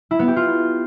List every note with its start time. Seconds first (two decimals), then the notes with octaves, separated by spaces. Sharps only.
0.11 E4
0.19 B3
0.28 G4
0.36 F4